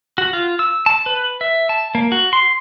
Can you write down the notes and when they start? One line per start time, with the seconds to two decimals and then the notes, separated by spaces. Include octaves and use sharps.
0.18 F#4
0.33 F4
0.59 E6
0.86 A5
1.06 B4
1.41 E5
1.69 A5
1.95 A#3
2.12 F#4
2.33 C6